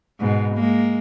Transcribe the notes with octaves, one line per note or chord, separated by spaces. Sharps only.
G#2 B2
G#3 A#3